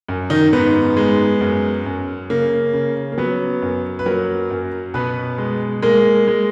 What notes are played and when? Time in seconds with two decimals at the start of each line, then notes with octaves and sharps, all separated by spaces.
0.08 F#2
0.30 D#3 D#4
0.53 G#2 B3
0.97 G#3
1.41 F#2
1.86 F#2
2.30 C#3 A#3
2.73 C#3
3.12 A#3
3.18 F#3 B3
3.62 F#2
3.99 B4
4.06 F#3 A#3 A#4
4.50 F#2
4.94 B2 B3 B4
5.38 G#3
5.82 G#3 A#3 A#4
6.28 G#3